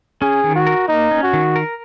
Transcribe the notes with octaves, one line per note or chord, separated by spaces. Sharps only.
C#4 G#4
D#3
F#4
A#4
A#3 D#4
C#4
F#4
D#3
A#4